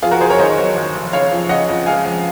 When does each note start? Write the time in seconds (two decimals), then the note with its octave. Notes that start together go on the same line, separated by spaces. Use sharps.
0.02 F2 F4 G#4
0.11 F#4 A#4
0.21 F#1 G#4 C5
0.29 A#4 C#5
0.39 D#3 C5 D#5
0.58 F#3
0.76 D#2
0.95 F1
1.13 C#3 C#5 F5
1.31 F3
1.49 C#3 D#5 F#5
1.69 F2
1.86 G#3 F5 G#5
2.05 F2